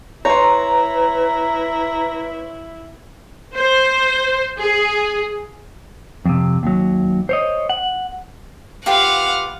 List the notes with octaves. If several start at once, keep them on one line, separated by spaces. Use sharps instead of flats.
E4 B4 C#5 A#5 C6
C5
G#4
F2 C3
D#2 F#3
C5 C#5 D#5
F#5
F4 G4 B4 F5 F#5